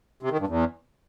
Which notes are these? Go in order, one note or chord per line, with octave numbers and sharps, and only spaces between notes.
C3
D#3
G2
E2